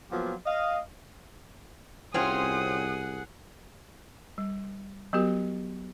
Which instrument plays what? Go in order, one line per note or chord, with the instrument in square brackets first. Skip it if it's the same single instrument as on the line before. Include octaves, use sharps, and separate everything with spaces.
[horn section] F3 F#3 A#3 B3 F4 G4
D#5 F5
[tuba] C2 [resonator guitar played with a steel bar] C4 C#4 F4 [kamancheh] G#4 F#5 [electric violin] D#6
[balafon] G3
F#3 B3 F#4 G4 A#4